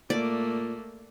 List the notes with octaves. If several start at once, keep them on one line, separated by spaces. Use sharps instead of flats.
A#2 A3 A#3 D5